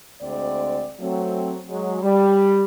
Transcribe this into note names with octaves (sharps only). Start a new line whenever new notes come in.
D2 G#3 C4 D5
F#3 A3 C4
F#3 G#3
G3